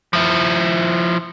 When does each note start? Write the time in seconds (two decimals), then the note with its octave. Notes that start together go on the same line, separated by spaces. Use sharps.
0.13 F3 E4